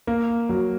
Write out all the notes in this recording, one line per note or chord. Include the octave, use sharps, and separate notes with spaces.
A#3
F#3